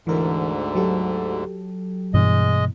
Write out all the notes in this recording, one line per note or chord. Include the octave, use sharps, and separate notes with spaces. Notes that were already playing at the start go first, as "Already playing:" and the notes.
D2 G#2 D3 E3 A#4
F#3 G4 A4
G2 B2 E3 G#3 D#5